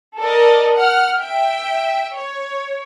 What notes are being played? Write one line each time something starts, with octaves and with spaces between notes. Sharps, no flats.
A4 A#4 D5 D#5
F#5 F6
E5 G5
C#5